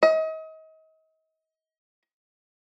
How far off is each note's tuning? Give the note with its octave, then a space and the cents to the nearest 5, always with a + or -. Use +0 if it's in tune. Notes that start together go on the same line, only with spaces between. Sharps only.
D#5 +35